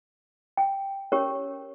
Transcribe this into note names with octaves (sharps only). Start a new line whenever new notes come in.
G5
C#4 G4 A#4 C#5